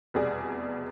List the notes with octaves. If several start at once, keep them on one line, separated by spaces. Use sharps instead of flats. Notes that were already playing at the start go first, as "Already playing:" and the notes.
F1 E2 B2 G3 G#4 D5